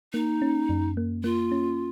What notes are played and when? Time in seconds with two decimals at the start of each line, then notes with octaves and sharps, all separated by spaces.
0.13 A#3 D#4
0.42 C#4
0.69 F#2
0.97 A#3
1.24 A#3 F4
1.52 C#4